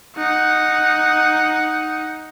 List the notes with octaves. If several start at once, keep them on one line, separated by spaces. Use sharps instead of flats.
D#4 F#5